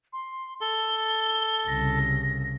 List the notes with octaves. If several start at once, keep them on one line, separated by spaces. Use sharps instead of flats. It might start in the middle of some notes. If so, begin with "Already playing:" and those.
C6
A4 G7
C2 C#3 A#6